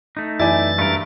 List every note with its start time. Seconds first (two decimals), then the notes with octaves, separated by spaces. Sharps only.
0.17 A3 D#4
0.40 F#2 E3 E4 D5 G#5 A6
0.78 G2 A3 A#4